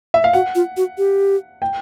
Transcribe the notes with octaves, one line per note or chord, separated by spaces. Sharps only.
E5
F5
F#4 F#5
F4
F#4
G4
G5